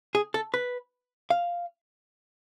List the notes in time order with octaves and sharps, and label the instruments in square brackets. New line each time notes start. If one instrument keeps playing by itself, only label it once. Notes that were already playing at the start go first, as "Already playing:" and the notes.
[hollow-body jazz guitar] G#4
A4
B4
F5